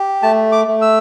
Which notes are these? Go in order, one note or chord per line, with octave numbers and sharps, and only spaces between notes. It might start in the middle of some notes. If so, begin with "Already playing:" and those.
Already playing: G4
A3 A5
D6
A3
E6